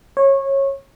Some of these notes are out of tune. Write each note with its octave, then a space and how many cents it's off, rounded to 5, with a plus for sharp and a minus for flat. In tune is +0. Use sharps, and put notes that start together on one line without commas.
C#5 -20